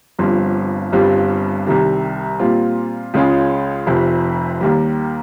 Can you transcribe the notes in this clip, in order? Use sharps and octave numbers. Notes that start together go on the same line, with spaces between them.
G1 G2 F3 C4
G1 G2 G3 C4 F4
C2 C3 D#3 G3
A#2 G3 C4 F4
C#2 C#3 G#3 C#4 F4
F1 F2 C3 F3
D#2 D#3 G3